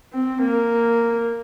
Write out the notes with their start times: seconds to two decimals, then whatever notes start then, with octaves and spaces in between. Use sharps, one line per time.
0.13 C4
0.43 A#3